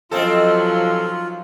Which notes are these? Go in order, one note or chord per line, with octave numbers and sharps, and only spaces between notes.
D#3 F3 F#3 C4 C#4 D#4 F4 A4